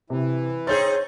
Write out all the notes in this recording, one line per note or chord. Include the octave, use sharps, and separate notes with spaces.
C3 E3
C4 D#4 G#4 C#5 G6 A6